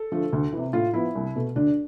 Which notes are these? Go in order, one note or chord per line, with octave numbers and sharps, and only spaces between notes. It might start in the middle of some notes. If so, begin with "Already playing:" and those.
Already playing: A4
D3 F3 A3
D2
C3 E3
A2 F4
F3 B3 E4
C2
B2 A3
D2 D4